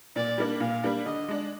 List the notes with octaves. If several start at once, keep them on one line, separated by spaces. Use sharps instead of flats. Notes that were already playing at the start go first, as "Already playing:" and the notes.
A#2 D5
G3 A#3 D4
A#2 F5
G3 A#3 D4
D3 D#5
G#3 D4